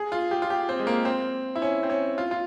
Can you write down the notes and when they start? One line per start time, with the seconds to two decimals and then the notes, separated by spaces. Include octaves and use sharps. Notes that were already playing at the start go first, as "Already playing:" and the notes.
Already playing: G#4
0.12 F4
0.31 G4
0.42 F4
0.50 G4
0.69 C4
0.79 G#3
0.87 A#3
1.05 C4
1.56 E4
1.62 C#4
1.83 C4
1.90 C#4
2.18 F4
2.31 F4